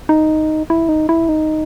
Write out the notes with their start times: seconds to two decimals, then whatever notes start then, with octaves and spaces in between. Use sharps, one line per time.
0.09 D#4
0.70 E4
0.89 D#4
1.09 E4
1.29 D#4